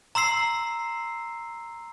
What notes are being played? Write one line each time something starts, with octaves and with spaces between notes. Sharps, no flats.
A#5 C6 E6 C7